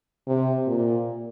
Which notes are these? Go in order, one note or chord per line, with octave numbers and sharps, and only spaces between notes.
C3
A#2